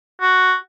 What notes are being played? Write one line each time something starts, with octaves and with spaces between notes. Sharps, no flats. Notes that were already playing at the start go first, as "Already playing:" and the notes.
F#4